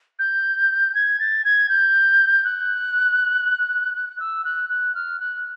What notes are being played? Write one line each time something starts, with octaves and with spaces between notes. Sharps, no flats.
G6
G#6
A6
G#6
G6
F#6
F#6
E6
F#6
F#6
F6
F#6